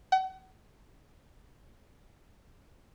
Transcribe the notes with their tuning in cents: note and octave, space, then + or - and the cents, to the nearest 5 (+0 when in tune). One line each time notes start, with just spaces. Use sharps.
F#5 +35